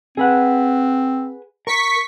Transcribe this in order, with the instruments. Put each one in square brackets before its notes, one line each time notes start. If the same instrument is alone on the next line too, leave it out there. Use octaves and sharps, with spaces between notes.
[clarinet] C4 [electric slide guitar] G#4 B4 F#5
[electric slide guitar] A#4 [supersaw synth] C#6 B6